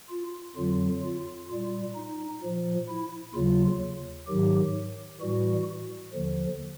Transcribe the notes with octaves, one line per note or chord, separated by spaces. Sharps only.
F4
F2 D3 F#3 F4
F4
A#2 G3 F4
D#4
A#2 F3
E4
D#2 C#3 F#3 F4
G#2 D#3 F#3 G4
A2 E3 G3 F#4
D#2 D3 F3